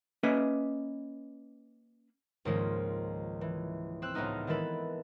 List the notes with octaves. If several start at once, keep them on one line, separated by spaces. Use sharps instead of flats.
A#3 C#4 B4 D#5 E5
C#2 G#2 D#3 F3 G#3 A#3
E3
C4 E6 F#6
C#2 A2 B3 D#4 F6
D#3 E3 G#3 A4 B4